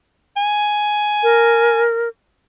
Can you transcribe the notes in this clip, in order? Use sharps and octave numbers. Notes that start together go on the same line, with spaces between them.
G#5
A#4